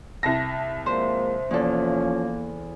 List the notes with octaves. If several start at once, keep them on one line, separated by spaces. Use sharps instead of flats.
C2 A5 A#6
F3 G#3 A#3 C5
E2 F3 A#3 C#4 A4